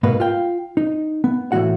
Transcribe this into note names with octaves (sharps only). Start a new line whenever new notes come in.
G#2 B2 A#3 B3 B4
F4 F5 G5
D#4
B3
A2 E3 F#3 G#3 F#4 F#5